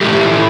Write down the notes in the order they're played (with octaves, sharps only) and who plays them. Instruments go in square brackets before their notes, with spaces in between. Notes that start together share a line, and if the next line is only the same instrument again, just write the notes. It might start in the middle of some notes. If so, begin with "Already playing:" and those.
[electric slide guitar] A2 A3 G4